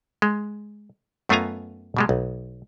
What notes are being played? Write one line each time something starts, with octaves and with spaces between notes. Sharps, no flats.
G#3
F#2 A3 B3 F4 G#5 A#5
B2 G3 G#3
B1